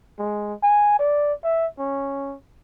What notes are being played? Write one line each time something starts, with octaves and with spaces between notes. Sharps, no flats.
G#3
G#5
D5
E5
C#4